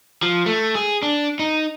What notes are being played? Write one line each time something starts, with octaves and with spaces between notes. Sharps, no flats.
F3
A3
G#4
D4
D#4